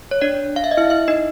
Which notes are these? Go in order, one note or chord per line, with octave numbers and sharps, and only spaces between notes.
C#5
D4 D5
F5
E5
D#5
E4 E5
E4 E5
D#4 D#5